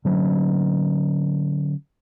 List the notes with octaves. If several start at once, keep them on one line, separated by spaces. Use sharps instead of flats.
D3 F#3 G3 C#4